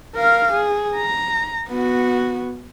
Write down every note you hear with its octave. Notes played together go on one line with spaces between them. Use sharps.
A#4 F5
G#4
A#5
B3 F#4